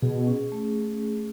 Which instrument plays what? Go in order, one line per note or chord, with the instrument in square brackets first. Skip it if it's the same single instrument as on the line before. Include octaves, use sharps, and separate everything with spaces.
[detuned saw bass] B2 [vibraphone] G#4
[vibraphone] C#4
A3